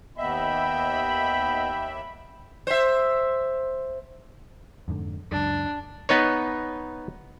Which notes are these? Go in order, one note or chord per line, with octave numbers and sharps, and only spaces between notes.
D#2 B3 D#5 E5 G5 B5
C5 E5
F2 G#2 D3
C#2 F#2 D4
B3 D#4 B4 C#5